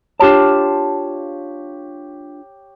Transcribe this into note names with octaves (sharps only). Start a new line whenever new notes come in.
D4 F4 G4 C#5 A5